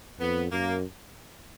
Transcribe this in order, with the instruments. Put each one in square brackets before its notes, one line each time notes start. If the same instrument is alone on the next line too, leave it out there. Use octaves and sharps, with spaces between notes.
[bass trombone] F2 [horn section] B3
[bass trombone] F#2 [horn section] A#3